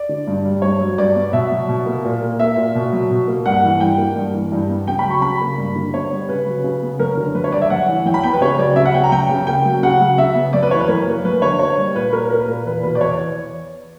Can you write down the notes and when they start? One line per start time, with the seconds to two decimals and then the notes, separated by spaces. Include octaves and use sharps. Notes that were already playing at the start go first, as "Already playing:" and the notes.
Already playing: D5
0.09 D3
0.27 G2
0.45 G3
0.62 G2 C#5
0.80 F#3
0.98 G2 D5
1.15 B3
1.33 B2 E5
1.52 F#3
1.69 B2
1.86 A#3
2.04 A#2
2.21 A#3
2.39 A#3 E5
2.56 A#2
2.75 B2
2.92 F#3
3.11 B2
3.28 A#3
3.46 G2 F#5
3.63 E3
3.80 G2 G5
3.98 A#3
4.16 G2
4.34 E3
4.52 G2
4.69 B3
4.87 C#3 G5
4.99 B5
5.05 F#3
5.10 C#6
5.22 C#3 B5
5.41 A#3
5.58 G2
5.76 D3
5.94 B3 C#5
6.12 G3
6.29 C#3 B4
6.46 F#3
6.64 C#3
6.82 B3
6.99 F#2 A#4
7.17 D3
7.35 F#2 B4
7.44 C#5
7.52 G3 D5
7.61 E5
7.70 F#2 F#5
7.88 E3
8.05 F#2 G5
8.14 B5
8.23 B3 G5
8.33 B4
8.41 C#3 C#5
8.58 F#3 D5
8.76 C#3 E5
8.86 F#5
8.94 B3 G5
9.04 A#5
9.12 F#2 G5
9.29 C#3
9.47 A#3 G5
9.65 F#3
9.83 C#3 F#5
10.01 F#3
10.18 C#3 E5
10.35 B3
10.53 F#2 D5
10.63 B4
10.71 E3 C#5
10.80 B4
10.88 F#2 A#4
11.07 A#3
11.25 F#2 B4
11.42 D3 C#5
11.59 A#3 C#5
11.77 G3
11.95 A#2 B4
12.13 A#3 A#4
12.30 A#3 A#4
12.39 B4
12.48 A#2 A#4
12.66 E2 B4
12.83 B2 B4
12.95 D5
13.01 E2 C#5